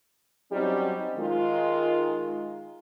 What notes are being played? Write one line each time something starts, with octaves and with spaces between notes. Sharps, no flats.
F#3 G3 C4 C#4 D#4 G4
D#3 G#3 F4